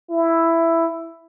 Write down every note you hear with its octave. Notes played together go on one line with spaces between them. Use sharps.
E4